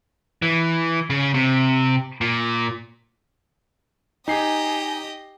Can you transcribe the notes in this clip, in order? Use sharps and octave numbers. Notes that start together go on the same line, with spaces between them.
E3
C#3
C3
A#2
D#4 G4 D#5 G#5 C7